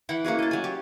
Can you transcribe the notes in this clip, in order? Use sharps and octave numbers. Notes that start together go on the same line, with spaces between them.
E3 E4 F#5 G5
A#3 C#4 F#4 G#4
D#5 A5
F#3 G#5
G4